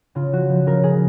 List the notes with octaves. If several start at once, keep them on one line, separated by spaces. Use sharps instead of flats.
C#3 F4
F3 F#4
F3
C#3 A#4
C#3 G#4